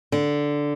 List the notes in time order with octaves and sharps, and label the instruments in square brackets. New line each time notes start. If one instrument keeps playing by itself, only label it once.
[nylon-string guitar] D3